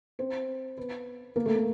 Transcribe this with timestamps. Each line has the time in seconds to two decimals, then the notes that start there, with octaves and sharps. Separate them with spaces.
0.19 C4 C5
0.77 B3 B4
1.36 A#3 A#4
1.46 A3 A4
1.55 A#3 A#4